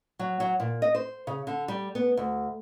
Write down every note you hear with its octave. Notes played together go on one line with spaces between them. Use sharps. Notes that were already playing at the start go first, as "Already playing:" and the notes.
F#3
F#3
A#2
D#5
C5
C#3
D3
G3
B3
D2